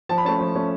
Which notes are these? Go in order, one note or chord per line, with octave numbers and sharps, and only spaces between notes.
F3 A5
B5
A3 C#4 A5
F3
A3 C#4